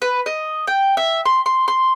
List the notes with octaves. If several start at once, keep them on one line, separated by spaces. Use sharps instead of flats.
B4
D#5
G5
E5
C6
C6
C6